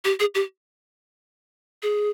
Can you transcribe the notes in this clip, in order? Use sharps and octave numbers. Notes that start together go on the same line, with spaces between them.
G4
G#4
G4
G#4